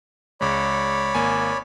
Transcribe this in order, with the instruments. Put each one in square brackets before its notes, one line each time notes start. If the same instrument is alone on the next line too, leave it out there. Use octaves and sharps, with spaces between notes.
[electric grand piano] C#2 G#3 [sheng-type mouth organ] C#5 D5 B5
[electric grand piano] G#1 A#3 G#5